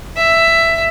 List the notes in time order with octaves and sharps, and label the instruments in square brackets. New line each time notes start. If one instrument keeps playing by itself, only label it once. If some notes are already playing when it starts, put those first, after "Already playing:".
[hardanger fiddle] E5